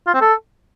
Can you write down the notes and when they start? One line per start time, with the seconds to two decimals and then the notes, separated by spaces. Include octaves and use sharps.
0.07 F4
0.14 C4
0.21 A4